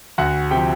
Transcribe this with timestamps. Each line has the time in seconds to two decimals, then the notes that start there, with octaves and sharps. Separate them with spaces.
0.18 D2 F#4 F#5
0.51 C3 F3 G4 G5